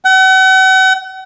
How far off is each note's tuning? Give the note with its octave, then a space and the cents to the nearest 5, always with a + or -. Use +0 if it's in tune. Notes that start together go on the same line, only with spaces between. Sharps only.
F#5 +40